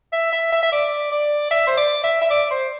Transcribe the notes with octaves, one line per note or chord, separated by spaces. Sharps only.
E5
E5
E5
E5
D5
D5
E5
C5
D5
E5
E5
D5
C5